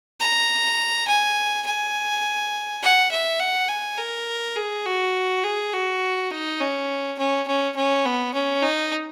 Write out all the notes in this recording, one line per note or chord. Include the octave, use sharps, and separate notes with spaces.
A#5
G#5
G#5
F#5
E5
F#5
G#5
A#4
G#4
F#4
G#4
F#4
D#4
C#4
C#4
C#4
C#4
B3
C#4
D#4